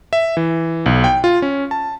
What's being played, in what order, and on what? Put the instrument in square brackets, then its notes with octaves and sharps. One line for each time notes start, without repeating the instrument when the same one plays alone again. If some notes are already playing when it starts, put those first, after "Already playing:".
[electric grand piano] E5
E3
B1
G5
F4
C#4
A5